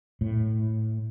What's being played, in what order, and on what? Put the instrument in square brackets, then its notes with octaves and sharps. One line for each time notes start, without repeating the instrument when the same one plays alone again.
[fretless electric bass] A2